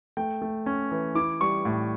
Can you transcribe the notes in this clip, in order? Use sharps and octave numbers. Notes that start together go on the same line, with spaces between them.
A3 G5
A3
C#4
E3
E4 D6
G3 C#6
A2